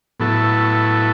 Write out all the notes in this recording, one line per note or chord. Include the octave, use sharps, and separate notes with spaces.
A2 F#3 B3 E4 A4